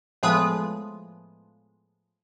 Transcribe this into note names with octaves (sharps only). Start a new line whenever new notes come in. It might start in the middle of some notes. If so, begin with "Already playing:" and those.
A2 F3 G#3 B3 D#6